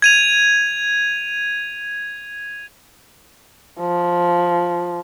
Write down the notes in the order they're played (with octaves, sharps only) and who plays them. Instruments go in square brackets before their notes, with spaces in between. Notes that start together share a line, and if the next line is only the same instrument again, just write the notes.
[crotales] G#6 D#7 F7
[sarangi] F3